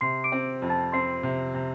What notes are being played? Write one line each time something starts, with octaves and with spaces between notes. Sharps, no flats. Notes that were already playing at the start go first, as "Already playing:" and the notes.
C3 C6 C7
D6 D7
C4
F2
A5 A6
C4 C6 C7
C3
C3